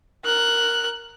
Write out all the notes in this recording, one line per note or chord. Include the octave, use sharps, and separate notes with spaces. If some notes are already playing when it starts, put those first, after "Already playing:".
A#4 F#6